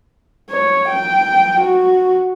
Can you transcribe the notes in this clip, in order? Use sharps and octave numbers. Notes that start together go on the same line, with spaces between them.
C#5
G5
F#4